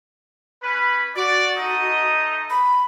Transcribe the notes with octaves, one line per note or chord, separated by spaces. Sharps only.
C#4 B4
F#4 D5
A3 D#4 D#5
B5